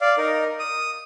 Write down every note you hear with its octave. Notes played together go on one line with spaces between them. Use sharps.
D5 F5
D#4 A#4
D#6